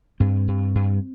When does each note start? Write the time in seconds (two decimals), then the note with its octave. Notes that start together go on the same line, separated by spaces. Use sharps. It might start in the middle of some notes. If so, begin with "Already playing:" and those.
0.20 G2 C4
0.48 G2
0.75 G2